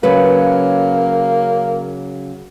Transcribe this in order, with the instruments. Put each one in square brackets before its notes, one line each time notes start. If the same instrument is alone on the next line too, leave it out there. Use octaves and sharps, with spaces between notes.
[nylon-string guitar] C#3 F#3 B4 [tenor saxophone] A#3